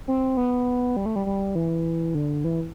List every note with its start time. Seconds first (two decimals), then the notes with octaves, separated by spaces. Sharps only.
0.08 C4
0.37 B3
0.97 G3
1.06 A3
1.16 G3
1.26 G3
1.55 E3
2.15 D3
2.44 E3